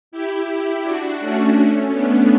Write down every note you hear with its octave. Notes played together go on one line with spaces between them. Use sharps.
E4 G4
D4 F#4
A3 C#4
B3 D4